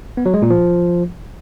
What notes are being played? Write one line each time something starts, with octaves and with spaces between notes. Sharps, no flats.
B3
F#3
G#3
A#2
F3